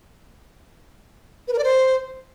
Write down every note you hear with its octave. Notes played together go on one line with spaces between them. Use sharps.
B4
A#4
D5
C5